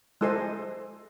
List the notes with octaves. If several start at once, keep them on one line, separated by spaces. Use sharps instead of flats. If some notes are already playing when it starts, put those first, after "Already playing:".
G#3 E4 A4 C5 D#5 G#5